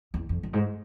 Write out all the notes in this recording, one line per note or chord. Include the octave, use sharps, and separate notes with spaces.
E2
F2
F#2
G#2